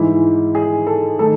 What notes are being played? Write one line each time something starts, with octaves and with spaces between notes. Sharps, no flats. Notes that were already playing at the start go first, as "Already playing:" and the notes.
Already playing: G#2 E3 G#3 E4
G#4
A4
D#3 A3 D#4 A4